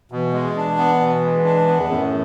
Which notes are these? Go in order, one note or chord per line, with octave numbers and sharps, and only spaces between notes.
B2 E3
G#3
D4
B3
B2
G#3
D4
B3
E2
F#2 A2